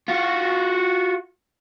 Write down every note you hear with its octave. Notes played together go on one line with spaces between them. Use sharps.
F4 F#4